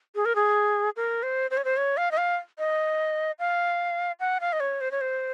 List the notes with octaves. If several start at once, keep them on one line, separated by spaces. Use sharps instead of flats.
G#4
A#4
G#4
A#4
C5
C5
C#5
C5
C#5
F5
D#5
F5
D#5
F5
F#5
F5
D#5
C#5
C5
C#5
C5